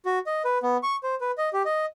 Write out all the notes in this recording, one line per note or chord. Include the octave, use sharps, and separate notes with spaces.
F#4
D#5
B4
B3
C#6
C5
B4
D#5
G4
D#5